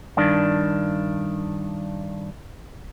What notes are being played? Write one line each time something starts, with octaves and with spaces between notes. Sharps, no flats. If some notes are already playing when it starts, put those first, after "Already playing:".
G2 D#3 D4